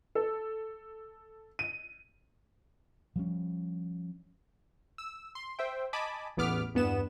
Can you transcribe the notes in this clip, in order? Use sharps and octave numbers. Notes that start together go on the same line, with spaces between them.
A4
D#7
F3 G3 C#4
E6
C6
C5 E5 G5
D#5 G#5 A5 B5 D6
A1 E2 B3 D6 F6 B6
E2 G2 B3 B4 E7